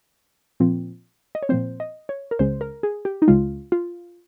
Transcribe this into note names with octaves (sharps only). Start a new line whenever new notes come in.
A#2 F3 C4
D#5
C#5
A#2 F3 C4 C5
D#5
C#5
A#4
C#2 C#3 G#3 C5
A#4
G#4
G4
D#4
C#2 C#3 G#3 F4
F4